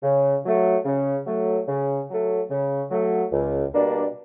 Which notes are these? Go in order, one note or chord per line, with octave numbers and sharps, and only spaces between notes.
C#3
F#3 A3
C#3
F#3 A3
C#3
F#3 A3
C#3
F#3 A3
C#2
B2 G3 A#3 D4